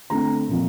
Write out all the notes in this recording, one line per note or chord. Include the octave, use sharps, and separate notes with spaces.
D3 A3 C4 A#5
A#2 F3 C4